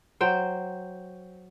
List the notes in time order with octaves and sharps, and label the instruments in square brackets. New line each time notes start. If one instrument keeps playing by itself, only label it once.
[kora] F#3 C5 G5